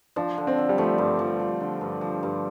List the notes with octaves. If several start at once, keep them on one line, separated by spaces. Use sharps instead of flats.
F3 D4
D3
C4
D3
G3
F3 A3
G2
F3
F3
D3
G2
F3
G2